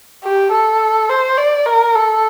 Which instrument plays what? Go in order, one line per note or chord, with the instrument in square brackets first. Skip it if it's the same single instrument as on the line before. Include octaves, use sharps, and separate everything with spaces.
[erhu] G4
A4
C5
D5
A#4
A4